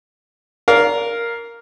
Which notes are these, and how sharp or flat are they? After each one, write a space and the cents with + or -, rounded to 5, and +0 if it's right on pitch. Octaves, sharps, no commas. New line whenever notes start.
A#4 +0 D5 -35 F5 +0